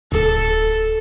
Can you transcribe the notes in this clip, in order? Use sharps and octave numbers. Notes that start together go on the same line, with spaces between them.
D1 A4